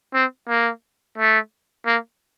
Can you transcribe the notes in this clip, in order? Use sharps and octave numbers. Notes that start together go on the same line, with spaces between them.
C4
A#3
A3
A#3